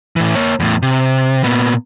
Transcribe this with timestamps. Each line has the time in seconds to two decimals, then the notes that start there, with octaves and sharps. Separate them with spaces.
0.16 A2 E3
0.35 A#3 C#5
0.60 E2 A2
0.82 C3
1.44 A#2 B3